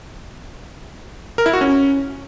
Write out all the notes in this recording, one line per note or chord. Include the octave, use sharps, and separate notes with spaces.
A#4
E4
F#4
C#4